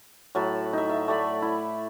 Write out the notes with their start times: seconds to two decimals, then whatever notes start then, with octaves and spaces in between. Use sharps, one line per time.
0.35 A2 F#3 A5 B5
0.73 D#4 E5
0.89 E5
1.08 A3 D5 B5
1.42 E4